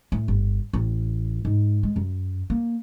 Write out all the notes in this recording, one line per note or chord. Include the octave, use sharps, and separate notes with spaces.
A2
G1
A1
G#2
G#3
F#2
A#3